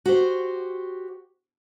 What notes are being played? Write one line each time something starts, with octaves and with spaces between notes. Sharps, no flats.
F#4 G4 C5